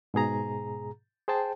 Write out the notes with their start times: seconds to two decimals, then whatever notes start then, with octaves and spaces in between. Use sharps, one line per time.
0.14 G#2 B2 G#4 A#5
1.28 G#4 C5 G5 A5